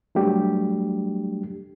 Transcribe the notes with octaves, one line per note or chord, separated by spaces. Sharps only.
F#3 G3 A3 D4 G4